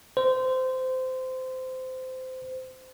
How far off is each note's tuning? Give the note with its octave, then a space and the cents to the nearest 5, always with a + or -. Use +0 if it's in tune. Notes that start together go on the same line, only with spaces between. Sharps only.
C5 -20